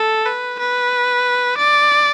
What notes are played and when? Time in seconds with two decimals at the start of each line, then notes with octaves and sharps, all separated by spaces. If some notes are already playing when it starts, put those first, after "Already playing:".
Already playing: A4
0.26 B4
0.60 B4
1.58 D5